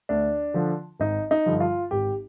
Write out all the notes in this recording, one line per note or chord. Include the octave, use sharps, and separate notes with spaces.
D2 D4
D3 F3
G#1 D#4
D#4
G2 D3 F3
F4
G#1 G4